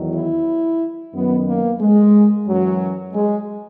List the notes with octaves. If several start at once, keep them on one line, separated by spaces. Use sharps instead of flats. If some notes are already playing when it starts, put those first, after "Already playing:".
Already playing: E2 D#3 F#3
E4
F#2 D#3 F#3 B3
A#3
G#3
F#2 E3 F#3
G#3